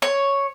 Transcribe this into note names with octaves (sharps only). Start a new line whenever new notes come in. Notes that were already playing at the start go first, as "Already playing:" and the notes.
C#5